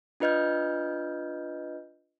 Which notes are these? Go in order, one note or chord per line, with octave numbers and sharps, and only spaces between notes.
D4 F4 B4 D#5 F6 G6